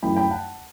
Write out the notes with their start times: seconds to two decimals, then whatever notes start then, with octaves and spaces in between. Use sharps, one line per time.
0.03 F#2 E3 A3 G5 B5
0.17 G5 B5
0.31 F#5 A5